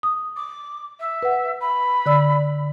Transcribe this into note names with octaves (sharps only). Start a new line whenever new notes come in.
D#6
D6
E5
B4 F#5
B5
D3 D5 E6